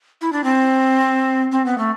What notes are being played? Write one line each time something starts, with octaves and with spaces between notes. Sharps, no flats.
E4
D4
C4
C4
B3
A3